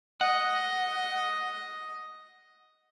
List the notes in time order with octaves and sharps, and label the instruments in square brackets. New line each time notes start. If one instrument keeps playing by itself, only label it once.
[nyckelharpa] D#5 [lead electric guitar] F#5